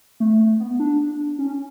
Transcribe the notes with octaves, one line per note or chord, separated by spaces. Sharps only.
A3
A3
B3
D4
C#4